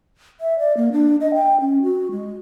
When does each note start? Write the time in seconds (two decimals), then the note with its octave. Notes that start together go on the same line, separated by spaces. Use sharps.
0.41 E5
0.59 D5
0.77 A#3
0.92 D4
1.21 D#5
1.34 G5
1.61 C#4
1.83 F#4
2.11 G#3